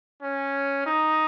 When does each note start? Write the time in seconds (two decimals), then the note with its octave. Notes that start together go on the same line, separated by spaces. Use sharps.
0.23 C#4
0.86 D#4